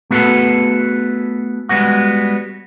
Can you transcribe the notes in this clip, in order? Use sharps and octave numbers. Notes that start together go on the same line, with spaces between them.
A3 B3 F#4 G#4 A4 B4
G3 G#3 B3 F#4